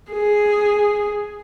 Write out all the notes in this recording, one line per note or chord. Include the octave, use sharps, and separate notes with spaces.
G#4